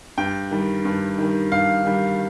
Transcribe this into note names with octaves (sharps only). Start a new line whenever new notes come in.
G2 G5
D#3 G3
G2
D#3 G3
G2 F5
D#3 G3